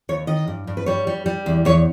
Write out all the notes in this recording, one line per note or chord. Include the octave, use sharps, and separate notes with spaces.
D#2 C#5
D#3 D#5
G2
G2
B4
G3 C#5
G3
G3
E2
E2 C#5